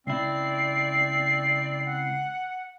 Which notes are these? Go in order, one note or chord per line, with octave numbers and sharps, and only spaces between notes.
C#2 C4 E4 D5 C7
F#5